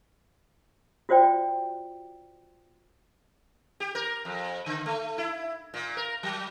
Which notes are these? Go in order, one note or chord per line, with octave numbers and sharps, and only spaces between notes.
F4 F#4 C5 D5 G5
G4
A#4
F2
D3
A3
E4
A#2
A#4
F#3